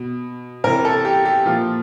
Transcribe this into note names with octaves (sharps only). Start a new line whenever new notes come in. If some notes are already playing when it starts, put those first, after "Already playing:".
Already playing: B2
C3 E3 A#4
A4
G4
G4
A#2 F3 F4